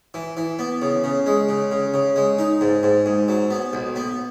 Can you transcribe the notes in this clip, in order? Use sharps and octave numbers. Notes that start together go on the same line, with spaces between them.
E3
E3
B3
C#3
C#3
G#3
C#3
C#3
C#3
G#3
D#4
G#2
G#2
G#2
F#3
B3
B1
B3